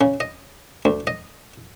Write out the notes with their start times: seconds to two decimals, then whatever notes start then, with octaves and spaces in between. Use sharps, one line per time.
0.01 C#3
0.20 D#5
0.85 D2
1.07 D#5